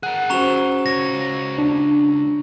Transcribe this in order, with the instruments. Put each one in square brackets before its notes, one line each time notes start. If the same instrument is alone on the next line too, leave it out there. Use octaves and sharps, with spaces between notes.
[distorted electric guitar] G#4 A#4 [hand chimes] F#5 [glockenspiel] F#6
[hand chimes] C#4 F#4 C5 [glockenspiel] A#5 C#6 F7
[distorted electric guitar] C#2 C#5 [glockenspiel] A#6
[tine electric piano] D4